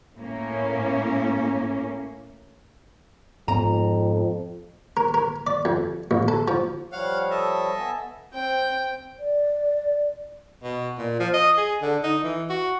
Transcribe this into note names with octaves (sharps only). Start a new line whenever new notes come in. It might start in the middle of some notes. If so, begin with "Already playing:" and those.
A2 A#3 C#4
F2 G#2 B3 A#5
A#4
A#4
D5
F2
A1
A4
F3
F3 G3 C#5 F5 F#5 F6
A4 D#5 E5
B3 G#5 A5
C4 G5
D5
B2
A#2
F3
D#5
G#4
D3
D#4
E3
F#4